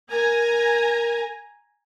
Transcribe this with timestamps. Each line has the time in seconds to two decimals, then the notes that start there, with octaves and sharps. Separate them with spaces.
0.11 A#4 G#5 A#5